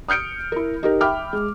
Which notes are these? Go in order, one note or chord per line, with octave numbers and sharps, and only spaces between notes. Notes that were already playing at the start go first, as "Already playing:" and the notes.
D#6 F6 G6 C#7 D7
E4 A#4
D#4 G4 A#4
E5 G5 B5 D6 F6
G#3